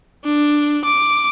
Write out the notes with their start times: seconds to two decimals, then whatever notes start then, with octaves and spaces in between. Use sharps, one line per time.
0.25 D4
0.85 D6